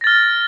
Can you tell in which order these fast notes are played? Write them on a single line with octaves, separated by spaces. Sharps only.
A#6 A6 F6